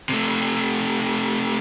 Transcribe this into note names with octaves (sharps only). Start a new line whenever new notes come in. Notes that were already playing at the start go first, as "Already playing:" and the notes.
C3 A3